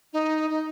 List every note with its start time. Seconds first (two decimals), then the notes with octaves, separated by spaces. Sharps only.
0.13 D#4
0.50 D#4